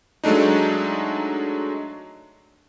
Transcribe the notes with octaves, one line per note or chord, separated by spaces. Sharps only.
F#3 G#3 A3 D4 D#4